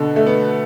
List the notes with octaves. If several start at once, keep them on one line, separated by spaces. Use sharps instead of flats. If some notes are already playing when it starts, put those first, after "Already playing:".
Already playing: B2 D3
A3
B3